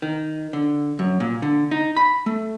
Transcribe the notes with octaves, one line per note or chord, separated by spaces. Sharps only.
D#3
D3
F#2
A#2
D3
D#4
B5
A3